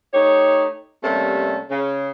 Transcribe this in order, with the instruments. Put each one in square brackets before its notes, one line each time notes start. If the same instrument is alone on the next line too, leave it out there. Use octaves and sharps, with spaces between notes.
[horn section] A3 D#4 G4 C#5
C3 G3 A3 A#3 C#4 A4
C#3